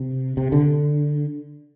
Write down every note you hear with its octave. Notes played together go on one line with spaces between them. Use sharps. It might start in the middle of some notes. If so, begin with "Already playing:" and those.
Already playing: C3
C3
D3